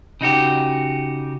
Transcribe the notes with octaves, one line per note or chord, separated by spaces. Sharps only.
C#3 D#4 F#4 G4